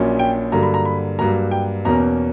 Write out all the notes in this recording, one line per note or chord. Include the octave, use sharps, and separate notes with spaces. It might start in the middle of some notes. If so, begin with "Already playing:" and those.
Already playing: A#1 A#2 F#3 C#4
G5
G2 D3 F#3 A#3 A#5
B5
A#5
B5
G2 F#3 A#3 A#5
G5
E2 B2 A#3 C#4 A#5